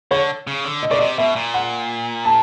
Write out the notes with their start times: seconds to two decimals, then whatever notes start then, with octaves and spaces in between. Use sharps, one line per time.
0.11 D3 C#5
0.47 C#3
0.65 D3
0.83 D#5
0.91 C#3 D5
0.99 C3 D#5
1.18 B2 E5
1.36 A#2
1.54 F#5
2.25 A5